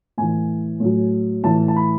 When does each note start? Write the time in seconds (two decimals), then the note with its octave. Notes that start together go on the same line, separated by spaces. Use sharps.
0.18 A2 E3 G#5
0.80 A2 F#3
1.43 A2 E3 A5
1.68 A5
1.76 B5